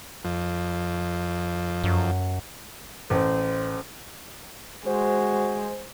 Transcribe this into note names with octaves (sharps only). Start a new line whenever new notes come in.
F2
F#2
A1 C5
G#3 F#4 C5